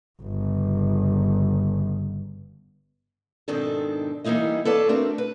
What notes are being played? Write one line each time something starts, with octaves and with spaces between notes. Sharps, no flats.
G1 C#3
G#2 B2 D#3 C4 D4 A4
E3 G3 A#3 D#4 E4 D#5
A4 B4 C#5 D5 F5 A5
A3 C4 D4 F#4 A#4
B4